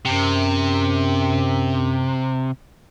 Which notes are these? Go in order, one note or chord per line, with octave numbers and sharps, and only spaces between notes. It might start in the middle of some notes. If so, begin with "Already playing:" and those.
F#2 C3